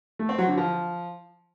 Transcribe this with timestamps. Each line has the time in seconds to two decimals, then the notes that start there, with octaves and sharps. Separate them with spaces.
0.19 A3
0.29 C4
0.38 F#3
0.48 D3
0.57 F3